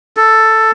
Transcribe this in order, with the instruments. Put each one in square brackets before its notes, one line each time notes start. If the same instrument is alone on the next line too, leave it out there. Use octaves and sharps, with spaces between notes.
[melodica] A4